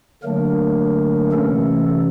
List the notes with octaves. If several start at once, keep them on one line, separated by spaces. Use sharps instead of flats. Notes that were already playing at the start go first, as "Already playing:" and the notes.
D3 F#3 A3 A#3 D4 A#4
C3 E3 A3 C#4 A4